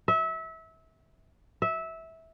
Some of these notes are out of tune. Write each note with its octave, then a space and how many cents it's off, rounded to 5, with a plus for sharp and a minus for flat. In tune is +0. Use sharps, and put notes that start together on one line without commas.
E5 -25
E5 -15